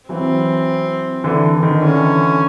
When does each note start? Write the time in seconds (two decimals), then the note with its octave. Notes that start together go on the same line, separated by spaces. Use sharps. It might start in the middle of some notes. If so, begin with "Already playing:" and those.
0.09 E3 F#3 C4
1.24 D3 E3
1.54 D3
1.63 D#3
1.82 D3 E3 C#4